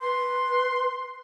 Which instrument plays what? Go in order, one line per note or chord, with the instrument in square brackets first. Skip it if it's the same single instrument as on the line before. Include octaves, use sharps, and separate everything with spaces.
[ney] B4 [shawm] C6